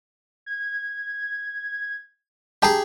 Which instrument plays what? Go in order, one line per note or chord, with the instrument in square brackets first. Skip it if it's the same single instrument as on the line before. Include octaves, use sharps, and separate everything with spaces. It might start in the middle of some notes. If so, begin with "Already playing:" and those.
[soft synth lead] G#6
[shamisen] D4 A5 A#5 [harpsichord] G4 G#4